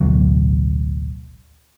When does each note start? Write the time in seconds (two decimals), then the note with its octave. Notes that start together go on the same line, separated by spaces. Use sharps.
0.01 A1 D2 B2 F#3